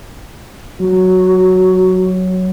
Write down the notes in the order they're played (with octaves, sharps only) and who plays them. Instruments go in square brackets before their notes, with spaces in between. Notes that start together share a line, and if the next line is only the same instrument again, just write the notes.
[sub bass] F#3 [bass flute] F#4